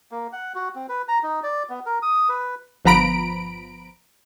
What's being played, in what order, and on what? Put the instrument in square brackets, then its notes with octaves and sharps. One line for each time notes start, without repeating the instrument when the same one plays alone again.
[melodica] A#3
F#5
F#4
C4
B4
A#5
D#4
D5
B3
A#4
D#6
B4
[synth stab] G1 F3 B3 A#5 B5 D7